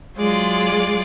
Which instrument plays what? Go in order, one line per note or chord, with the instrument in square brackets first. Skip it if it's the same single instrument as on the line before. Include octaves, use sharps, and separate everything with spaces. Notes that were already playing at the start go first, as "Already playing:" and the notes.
[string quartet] F#3 G#3 F4 D5